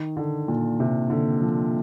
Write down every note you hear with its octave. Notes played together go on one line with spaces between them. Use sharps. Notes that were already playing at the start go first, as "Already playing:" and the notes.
Already playing: D#3
D3
A#2
C3
D3
F3